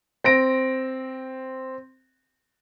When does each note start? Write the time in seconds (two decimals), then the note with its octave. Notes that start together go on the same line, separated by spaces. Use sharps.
0.24 C4 A#6 D7